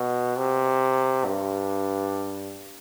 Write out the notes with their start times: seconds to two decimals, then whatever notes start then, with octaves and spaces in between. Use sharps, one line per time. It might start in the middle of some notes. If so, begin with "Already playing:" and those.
Already playing: B2
0.37 C3
1.25 G2